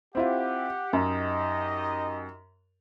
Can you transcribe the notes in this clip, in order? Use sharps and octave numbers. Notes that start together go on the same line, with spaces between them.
C4 E4 F4 G4 F#5
F#2 D#4 G4 D#5